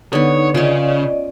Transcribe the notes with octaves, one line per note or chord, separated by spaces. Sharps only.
D3 B3 D#4 C#5
C#3 C#4 F4 D5 D#5